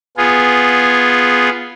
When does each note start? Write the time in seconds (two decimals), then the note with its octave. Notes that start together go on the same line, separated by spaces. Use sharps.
0.17 B3 F4 G#4